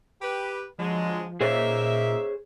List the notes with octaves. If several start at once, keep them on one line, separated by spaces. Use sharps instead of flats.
G4 B4
D3 F3 F#3 G#3
A#2 A#3 D#4 G#4 C5 C#5 E5